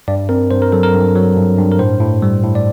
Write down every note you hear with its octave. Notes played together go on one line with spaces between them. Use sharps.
G2 D5
C4 A#4
G2 C5
A#4
F#3 A4
A#4
G2
F#3
G2
G2
A#4
A2 C5
A2
G3
A2
D5